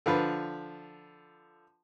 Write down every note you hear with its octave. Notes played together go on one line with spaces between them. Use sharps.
D3 F3 B4